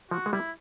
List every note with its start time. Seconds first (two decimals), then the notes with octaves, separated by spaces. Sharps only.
0.11 F3 F#4
0.26 G#3
0.33 G3 E4